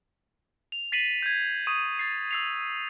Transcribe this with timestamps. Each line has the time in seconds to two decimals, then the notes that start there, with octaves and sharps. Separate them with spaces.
0.72 F7
0.92 A6 B6 C7 D#7 F#7
1.23 G6 G#6
1.67 C#6 D#6 D#7
1.99 A6 C7
2.31 E6 C7 F7